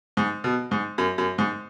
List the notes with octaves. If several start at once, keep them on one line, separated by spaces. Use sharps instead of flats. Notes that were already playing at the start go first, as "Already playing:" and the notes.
G#2
B2
G#2
F#2
F#2
G#2